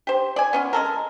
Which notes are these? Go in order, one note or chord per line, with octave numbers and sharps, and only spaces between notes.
G4 C5
D5 G#5
B3 C#4 F4
G#3 A4 A#4